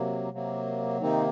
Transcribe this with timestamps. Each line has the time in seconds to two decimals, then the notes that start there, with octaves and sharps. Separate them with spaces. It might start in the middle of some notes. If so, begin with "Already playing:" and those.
Already playing: C3 F#3 A#3
0.32 C3 F#3 A#3
1.01 C3 D#3 A#3 C4 D#4